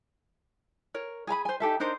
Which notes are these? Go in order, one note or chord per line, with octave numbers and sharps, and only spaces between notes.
A#4 C#5
G#4 G#5 A#5 B5
C5 G#5
D#4 G4 A4 E5
D4 D#4 A#4 C5